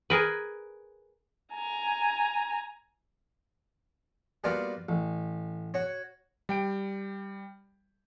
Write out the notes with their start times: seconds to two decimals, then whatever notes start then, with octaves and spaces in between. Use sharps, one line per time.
0.10 G#4 A#4 B4
1.53 G#5 A#5
4.44 G3 A#3 B3 F4 F#4 A#4
4.89 A1
5.74 F#4 C#5
6.49 G3 G5 D7